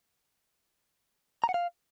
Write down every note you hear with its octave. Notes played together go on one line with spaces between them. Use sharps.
A#5
F#5
F5